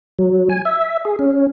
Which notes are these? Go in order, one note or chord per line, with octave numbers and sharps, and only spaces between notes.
F#3
G#5
E5
G#4
C#4